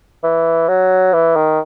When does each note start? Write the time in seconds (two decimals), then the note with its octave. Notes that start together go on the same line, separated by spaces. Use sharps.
0.23 E3
0.68 F#3
1.14 E3
1.36 D#3